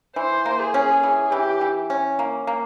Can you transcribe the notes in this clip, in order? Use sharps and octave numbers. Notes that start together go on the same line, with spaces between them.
E3 C5
A#3
G#4
C#4
E3 G#4
E3 G4
E3
C#4
A#3
A#3